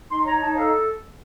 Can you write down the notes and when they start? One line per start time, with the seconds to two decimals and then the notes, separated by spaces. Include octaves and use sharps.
0.08 D#4 C6
0.24 C#5 A#5
0.40 D#4 A5
0.56 A4 F5